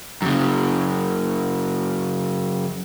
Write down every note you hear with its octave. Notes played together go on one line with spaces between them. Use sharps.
F#2 C#3